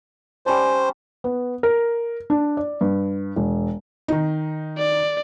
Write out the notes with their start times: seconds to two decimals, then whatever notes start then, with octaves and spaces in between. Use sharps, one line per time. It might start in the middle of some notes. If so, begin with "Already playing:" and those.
0.46 G3 C#4 C5 A5
1.24 B3
1.63 A#4
2.30 D4
2.57 D5
2.81 G2
3.36 E1
4.08 D#3 D#4
4.78 D5